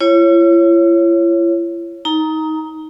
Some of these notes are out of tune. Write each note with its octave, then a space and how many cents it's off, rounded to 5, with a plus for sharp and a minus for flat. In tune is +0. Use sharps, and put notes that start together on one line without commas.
E4 +45 C#5 -10
D#4 +20 A#5 +0